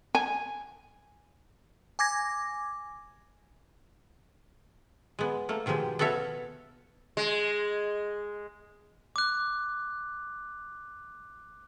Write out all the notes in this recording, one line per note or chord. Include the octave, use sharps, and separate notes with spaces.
G#5
G#5 D6 G#6 A#6
G#3 B3
A3 A#3
B2 D#3 F3 G#3 G4
B3 F#4 A4 C#5 E5 F5
G#3
D6 F#6